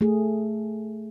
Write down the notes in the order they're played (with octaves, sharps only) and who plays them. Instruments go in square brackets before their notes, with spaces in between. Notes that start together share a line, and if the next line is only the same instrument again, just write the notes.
[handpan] A3 G#4